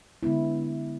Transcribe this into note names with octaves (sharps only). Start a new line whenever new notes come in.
D3 G#3 B3 E4